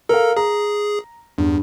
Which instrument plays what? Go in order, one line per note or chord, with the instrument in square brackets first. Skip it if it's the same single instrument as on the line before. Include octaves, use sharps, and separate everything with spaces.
[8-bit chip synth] A4 [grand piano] A#4 F5
[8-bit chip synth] G#4 [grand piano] A#5
[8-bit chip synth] E2 [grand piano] G2